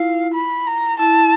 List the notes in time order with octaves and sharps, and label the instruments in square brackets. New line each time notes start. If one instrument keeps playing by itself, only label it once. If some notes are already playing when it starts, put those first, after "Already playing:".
Already playing: [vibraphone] E4 F4 [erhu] F5
[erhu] B5
A#5
[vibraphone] E4 [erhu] A5